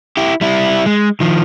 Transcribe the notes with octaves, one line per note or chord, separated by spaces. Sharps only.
E4 G4
G3 E4
G#3
D#3 F3